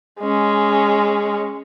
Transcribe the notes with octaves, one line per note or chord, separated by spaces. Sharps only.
G#3 C#4